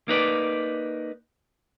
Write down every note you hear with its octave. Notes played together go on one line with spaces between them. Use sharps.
A#3 D#4 B4 D5